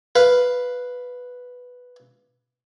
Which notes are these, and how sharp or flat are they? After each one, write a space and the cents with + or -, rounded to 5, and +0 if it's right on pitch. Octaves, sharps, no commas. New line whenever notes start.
B4 +0 F5 +0